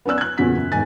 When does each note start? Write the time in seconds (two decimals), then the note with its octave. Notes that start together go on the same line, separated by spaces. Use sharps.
0.05 B3 C#4 D5 E6 F#6
0.18 F#6 G#6
0.38 E2 A#2 C#3 F#4 B6
0.56 F#2
0.72 E1 G#2 D#3 G#5 A6